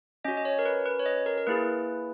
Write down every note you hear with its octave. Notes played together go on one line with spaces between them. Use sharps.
C#4 F#4 D#5
D#5
C#5
A#4
B4
B4
C#5
D#5
A#4
A#4
A#3 E4 G#4 B4